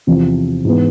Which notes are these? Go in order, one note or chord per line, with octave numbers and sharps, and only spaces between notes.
E2 C3 F3
G#2 E3 B3